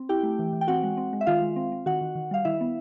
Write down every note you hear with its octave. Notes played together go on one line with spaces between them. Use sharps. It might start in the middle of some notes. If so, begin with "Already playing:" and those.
Already playing: C4
E4 G4 G5
A3
E3
E3
G5
C4 F#4 F#5
G#3
C4
G#3
E5
D#3 F4 F5
G#3
C4
C4
D#3 F#4 F#5
D#3
D#3
G3 F5
D#3 E4 E5
B3